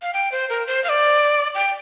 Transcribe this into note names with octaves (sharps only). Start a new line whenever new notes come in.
F5
G5
C5
A#4
C5
F5
D5
G5